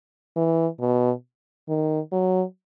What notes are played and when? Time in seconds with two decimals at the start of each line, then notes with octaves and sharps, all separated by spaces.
0.36 E3
0.80 B2
1.69 D#3
2.12 F#3